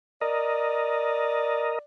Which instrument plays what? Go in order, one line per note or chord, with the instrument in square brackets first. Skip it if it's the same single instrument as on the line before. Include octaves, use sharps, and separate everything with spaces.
[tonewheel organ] A#4 D#5 [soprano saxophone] D5